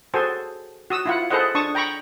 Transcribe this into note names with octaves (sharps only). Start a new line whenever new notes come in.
F#4 G#4 A4 C5 G#5
F#4 D#6 E6
E4 F4 F#5
G#4 A4 B4 C5 D#5 F#5
D4 A5 C#6 D#6
G5 A#5 B5 C#6